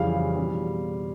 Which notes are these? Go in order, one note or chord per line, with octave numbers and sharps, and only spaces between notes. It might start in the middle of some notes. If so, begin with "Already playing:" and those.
Already playing: F2 C#3 E3 G3 F5
B2 G3